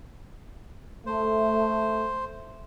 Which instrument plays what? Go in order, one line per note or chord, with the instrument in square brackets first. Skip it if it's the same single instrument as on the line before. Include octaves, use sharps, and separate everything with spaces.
[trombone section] A3 [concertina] C5